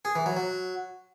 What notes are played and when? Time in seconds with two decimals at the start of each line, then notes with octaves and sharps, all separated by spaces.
0.05 G#4
0.15 E3
0.26 F#3
0.37 F#3